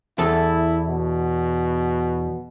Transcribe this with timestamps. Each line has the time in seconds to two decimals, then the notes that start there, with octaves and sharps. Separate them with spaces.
0.18 E2 E4 A4
0.88 B2